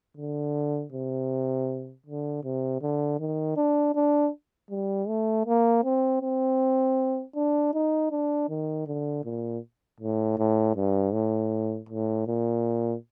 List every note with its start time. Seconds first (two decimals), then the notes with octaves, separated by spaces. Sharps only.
0.17 D3
0.92 C3
2.06 D3
2.44 C3
2.82 D3
3.20 D#3
3.56 D4
3.95 D4
4.70 G3
5.08 A3
5.46 A#3
5.84 C4
6.21 C4
7.36 D4
7.73 D#4
8.11 D4
8.49 D#3
8.87 D3
9.24 A#2
10.00 A2
10.38 A2
10.75 G2
11.13 A2
11.89 A2
12.27 A#2